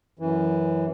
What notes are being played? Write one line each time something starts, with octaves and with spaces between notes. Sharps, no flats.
F#2 E3